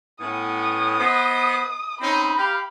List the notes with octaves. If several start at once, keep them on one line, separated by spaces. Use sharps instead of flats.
A2 B3 C#4 D#6
B3 C5 D#5
C4 C#4 D#4 B5
G4 F5